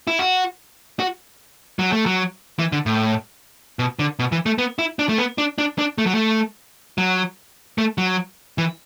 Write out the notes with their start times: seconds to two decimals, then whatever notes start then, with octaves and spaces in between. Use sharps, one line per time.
0.07 E4
0.19 F#4
1.00 F#4
1.79 F#3
1.92 A3
2.06 F#3
2.59 E3
2.72 D3
2.86 A2
3.79 B2
3.99 D3
4.19 B2
4.32 E3
4.46 A3
4.58 B3
4.79 E4
4.99 D4
5.09 A3
5.18 B3
5.38 D4
5.58 D4
5.79 D4
5.98 A3
6.06 F#3
6.15 A3
6.98 F#3
7.78 A3
7.98 F#3
8.58 E3